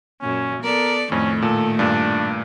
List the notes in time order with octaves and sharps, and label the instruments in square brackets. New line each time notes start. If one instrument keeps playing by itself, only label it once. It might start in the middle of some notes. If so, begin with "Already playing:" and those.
[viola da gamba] F#2 A#2 [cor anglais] C#4
[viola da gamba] B3 A4 D5 [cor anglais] A#4
[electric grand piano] F2 [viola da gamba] A2 D#3 A3 [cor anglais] C#4
[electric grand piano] A#2 [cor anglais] A4
[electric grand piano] G2 A#2 [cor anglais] D4